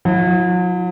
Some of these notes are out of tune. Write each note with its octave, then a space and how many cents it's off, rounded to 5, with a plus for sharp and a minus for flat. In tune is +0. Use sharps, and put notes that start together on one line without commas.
F#3 -40 E4 +0